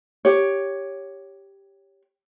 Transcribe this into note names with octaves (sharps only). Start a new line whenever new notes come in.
G4 C#5